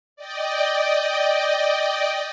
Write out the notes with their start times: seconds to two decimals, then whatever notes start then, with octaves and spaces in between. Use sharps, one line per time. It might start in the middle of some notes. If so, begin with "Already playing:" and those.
0.16 D5 D#5 G5